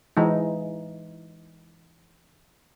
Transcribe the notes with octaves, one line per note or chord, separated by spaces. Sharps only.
E3 G#3 D#4